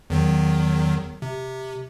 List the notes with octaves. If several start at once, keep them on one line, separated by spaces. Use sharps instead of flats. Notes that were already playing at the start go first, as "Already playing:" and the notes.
E2 D#3 F#3
C3